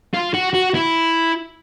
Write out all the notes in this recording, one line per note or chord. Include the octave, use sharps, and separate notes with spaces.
F4
F#4
F#4
E4